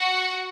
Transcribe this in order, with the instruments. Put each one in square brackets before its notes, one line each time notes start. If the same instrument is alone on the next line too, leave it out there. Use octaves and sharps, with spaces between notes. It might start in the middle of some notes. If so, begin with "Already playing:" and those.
Already playing: [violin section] F#4 F#5